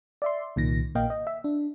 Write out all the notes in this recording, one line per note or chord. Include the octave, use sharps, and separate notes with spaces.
D5 E5 C6
C2 A#2 D#3 A#6
A#1 A#2 A#3 D#5 F5 G5
D#5
E5
D4